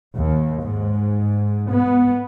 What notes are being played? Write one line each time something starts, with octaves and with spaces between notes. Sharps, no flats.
D#2
G#2
B3